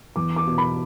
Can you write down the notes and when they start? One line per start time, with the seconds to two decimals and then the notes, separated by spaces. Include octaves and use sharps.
0.16 E2 D6
0.36 D6
0.47 B2
0.58 B5